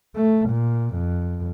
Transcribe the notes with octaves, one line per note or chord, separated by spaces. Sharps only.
A3
A#2
F2